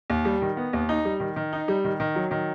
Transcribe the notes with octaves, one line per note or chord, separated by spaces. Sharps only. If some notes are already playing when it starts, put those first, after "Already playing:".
D#2
G3
D#3
B3
D#2
D#4
G3
D#3
D#3
D#4
G3
D#3
D#3
F#3
D#3